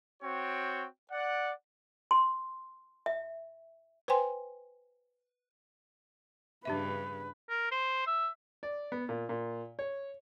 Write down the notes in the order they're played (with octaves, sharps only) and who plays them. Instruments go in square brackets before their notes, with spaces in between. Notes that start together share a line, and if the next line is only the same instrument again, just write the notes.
[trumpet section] C4 F#4 C#5 G5
D5 F#5
[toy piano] C6
E5
[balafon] B4 C5 G5 G#5 C6
[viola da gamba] G2 C#3 [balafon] D4 G4 E5 [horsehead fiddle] B4
[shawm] A#4
C5
E5
[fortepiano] D5
B3
A#2
A#2
C#5